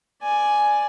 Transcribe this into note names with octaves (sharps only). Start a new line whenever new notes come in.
D5 G#5